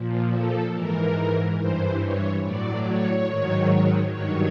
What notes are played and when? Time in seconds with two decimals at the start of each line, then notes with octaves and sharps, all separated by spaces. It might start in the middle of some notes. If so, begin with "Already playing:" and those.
Already playing: A#2 F3
0.31 A4
0.73 G#2 E3 A#4
1.58 G2 E3 C5
2.01 C#5
2.42 A2 F#3 D5
2.85 C#5
3.28 G#2 D#3 F#3
4.11 G2 D#3 F#3 C#5